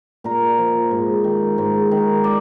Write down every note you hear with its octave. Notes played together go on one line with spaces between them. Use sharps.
A#2 A#4
F3
G#2
D#3
G#2
D#3
D5